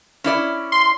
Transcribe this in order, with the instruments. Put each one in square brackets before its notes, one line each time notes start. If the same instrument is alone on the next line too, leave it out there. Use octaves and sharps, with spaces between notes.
[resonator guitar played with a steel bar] C#4 E4 D5
[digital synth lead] C6